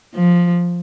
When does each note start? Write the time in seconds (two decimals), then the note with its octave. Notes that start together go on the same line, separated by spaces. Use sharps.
0.14 F3